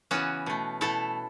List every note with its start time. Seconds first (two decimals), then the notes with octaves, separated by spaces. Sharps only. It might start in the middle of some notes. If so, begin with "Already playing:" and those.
0.11 C#3 E3 B3 C#4 F#4
0.46 B2 A3
0.81 B2 A3 E4 A4